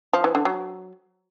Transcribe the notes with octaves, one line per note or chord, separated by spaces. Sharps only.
F3
E3
D3
F#3